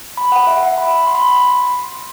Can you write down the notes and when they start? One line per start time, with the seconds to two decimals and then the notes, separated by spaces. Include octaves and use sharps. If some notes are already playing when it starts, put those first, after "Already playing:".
0.17 B5
0.32 F#5
0.47 E5
0.63 F#5
0.78 B5
1.07 C6
1.15 B5
1.22 C6
1.37 B5
1.67 C6
1.96 B5